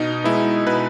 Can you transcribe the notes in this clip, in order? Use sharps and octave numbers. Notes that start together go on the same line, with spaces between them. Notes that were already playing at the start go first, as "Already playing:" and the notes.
Already playing: B2 D#4
G#3 B3 E4
B2 B4